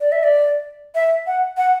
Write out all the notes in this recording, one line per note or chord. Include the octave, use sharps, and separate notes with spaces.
D5
E5
D5
E5
F#5
F#5